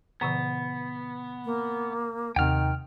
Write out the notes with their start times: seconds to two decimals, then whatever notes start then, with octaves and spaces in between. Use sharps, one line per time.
0.21 A#2 C#3 E3 B3
1.45 A#3
2.36 D#2 C3 D#3 F#5 G5 F6